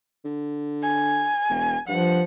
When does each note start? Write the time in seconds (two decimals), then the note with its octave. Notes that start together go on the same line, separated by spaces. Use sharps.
0.24 D3
0.82 G#5
1.49 E1
1.88 G2 F3 F#5